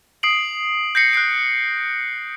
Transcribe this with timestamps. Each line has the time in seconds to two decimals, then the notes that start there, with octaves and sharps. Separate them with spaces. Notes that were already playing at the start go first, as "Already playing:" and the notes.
0.23 D#6 C7 D7 F#7
0.95 G6 A#6 C7 C#7
1.13 F#6 G6 C7 D7